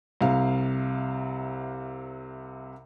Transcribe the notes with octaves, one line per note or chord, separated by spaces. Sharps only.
C2 C3 F5